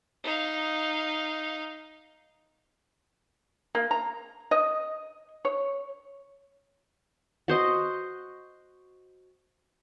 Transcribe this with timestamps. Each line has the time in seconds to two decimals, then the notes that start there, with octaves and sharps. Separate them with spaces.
0.24 D#4 F5
3.75 A#3
3.91 A#5
4.51 D#5
5.45 C#5
7.48 F#4 C5 D#5